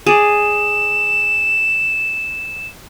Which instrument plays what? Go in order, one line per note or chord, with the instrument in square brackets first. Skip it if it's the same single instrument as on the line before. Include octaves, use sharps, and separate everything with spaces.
[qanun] G#4 D5 [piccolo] E7